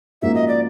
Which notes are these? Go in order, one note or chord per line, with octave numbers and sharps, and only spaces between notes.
G#2 F3 A#3 C#4 F#4 E5
D#5
D5